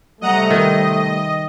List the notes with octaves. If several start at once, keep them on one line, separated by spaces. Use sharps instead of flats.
C3 G3 A3 D#5 F#5 A#5
D#3 D#5